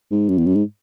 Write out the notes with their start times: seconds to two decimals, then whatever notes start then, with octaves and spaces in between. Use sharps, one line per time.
0.11 G#2
0.29 F#2
0.38 E2
0.47 F#2
0.55 G#2